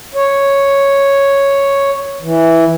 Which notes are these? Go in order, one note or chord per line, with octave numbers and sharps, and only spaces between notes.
C#5
E3